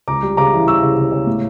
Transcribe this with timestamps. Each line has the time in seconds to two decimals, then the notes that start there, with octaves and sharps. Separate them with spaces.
0.08 C#2 A#5 D6
0.23 G3
0.37 C#3 A#5 D6
0.53 E3
0.67 G3 C#6 E6
0.83 C#3
0.97 C#3
1.12 C#3
1.27 A2